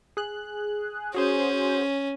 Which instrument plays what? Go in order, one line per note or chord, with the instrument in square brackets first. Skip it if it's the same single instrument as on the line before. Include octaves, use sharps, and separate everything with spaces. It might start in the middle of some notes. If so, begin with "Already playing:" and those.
[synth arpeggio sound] G#4 F#6
[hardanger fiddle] C#4 [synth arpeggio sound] F#4 G#4 C5